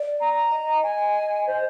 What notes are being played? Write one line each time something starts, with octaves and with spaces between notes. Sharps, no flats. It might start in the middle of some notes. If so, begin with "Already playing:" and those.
Already playing: D5
A#5
D#5
D#5 G#5
C5